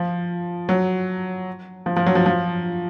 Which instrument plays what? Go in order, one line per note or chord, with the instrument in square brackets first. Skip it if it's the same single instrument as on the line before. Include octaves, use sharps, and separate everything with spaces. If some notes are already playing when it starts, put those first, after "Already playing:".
Already playing: [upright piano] F3
F#3
F3
F3
F#3
F3
F3